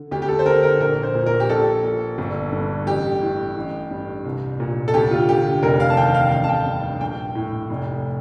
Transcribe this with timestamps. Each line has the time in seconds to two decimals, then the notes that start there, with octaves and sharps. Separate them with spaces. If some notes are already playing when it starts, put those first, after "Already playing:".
Already playing: D3
0.11 D2 G4
0.22 G4
0.28 A4
0.39 C5
0.45 D3 A#4
0.63 A#4
0.80 A#1 A#4
1.03 C5
1.15 A#2
1.26 A#4
1.40 G4
1.49 A#1 A4
1.84 A#2
2.18 G1
2.52 G2
2.87 A1 G4
3.22 A2
3.56 A1
3.91 G2
4.25 C2
4.60 A#2
4.88 A4
4.94 D2 G4
5.11 F4
5.29 D3 G4
5.63 F1 A#4
5.80 F5
5.90 A5
5.97 D#2 G5
6.14 F5
6.32 A1 F5
6.44 A5
6.49 G5
6.66 G2
7.01 A#1 G5
7.35 A2
7.70 F1